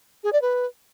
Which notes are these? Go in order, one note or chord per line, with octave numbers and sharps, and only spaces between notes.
G#4
D5
B4